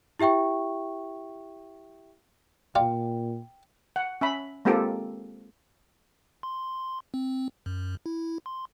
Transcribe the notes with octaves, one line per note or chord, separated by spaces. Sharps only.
E4 G4 E5 G5 C#6
A#2 F4 D5 G5
F#5
C#4 E5 B5
G#3 A#3 C4 F4 G4 A4
C6
C4
F#2
E4
C6